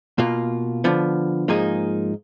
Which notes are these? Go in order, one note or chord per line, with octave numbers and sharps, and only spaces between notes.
B2 A#3 F4
D3 F3 B3
G#2 F3 A#3 D#4 G#4